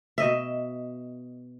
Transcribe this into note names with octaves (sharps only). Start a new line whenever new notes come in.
B2 D#5 E5